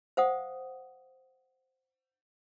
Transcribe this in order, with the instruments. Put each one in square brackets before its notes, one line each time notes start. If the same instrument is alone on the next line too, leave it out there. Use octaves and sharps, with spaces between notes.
[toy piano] C5 F5 F#5 D#6